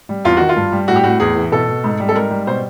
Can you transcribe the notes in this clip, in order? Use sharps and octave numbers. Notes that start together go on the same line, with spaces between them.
G3
E2 F4
D#3 F#4
F4
G2
G3
A2 F#4
G4
A2 F#4
E2 G#4
E3
B2 A4
B2
G#2
G3
A4
G#2 A#4
G3
B2 C5